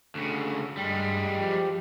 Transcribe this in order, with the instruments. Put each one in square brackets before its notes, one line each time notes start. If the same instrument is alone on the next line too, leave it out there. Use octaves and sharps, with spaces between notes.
[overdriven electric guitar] D2 C#3
[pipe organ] G2 [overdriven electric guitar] G3 G#3
[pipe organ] F3 G4